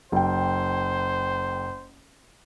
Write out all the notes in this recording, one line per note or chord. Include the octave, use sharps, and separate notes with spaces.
F#1 C5 G5